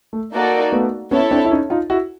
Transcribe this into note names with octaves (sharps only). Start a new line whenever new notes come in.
A3
A#3 D#4 F#4 A4 D5
A3 B3
B3 C#4 E4 A4 C#5
C4 D4
E4
C#4 D#4
D#4 F4
E4 F#4